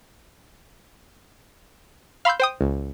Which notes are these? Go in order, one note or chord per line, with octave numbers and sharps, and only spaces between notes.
F5 B5 C6 E6 G6
C5 G5 D#6
C#2